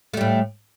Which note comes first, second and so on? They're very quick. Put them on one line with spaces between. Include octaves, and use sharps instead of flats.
A3 G3 A2